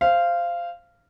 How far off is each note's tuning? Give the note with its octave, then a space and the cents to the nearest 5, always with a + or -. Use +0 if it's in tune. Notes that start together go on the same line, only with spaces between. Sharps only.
C5 +0 F5 -15